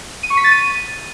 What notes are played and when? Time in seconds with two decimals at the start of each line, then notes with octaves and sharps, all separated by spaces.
0.23 D#7
0.30 C#6
0.37 B6
0.44 A6
0.51 D#7